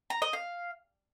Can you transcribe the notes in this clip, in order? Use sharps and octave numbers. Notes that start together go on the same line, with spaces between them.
A#5
D#5
F5